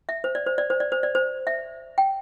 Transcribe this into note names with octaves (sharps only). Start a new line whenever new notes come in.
E5
C5
D5
C5
D5
C5
D5
C5
D5
C5
E5
G5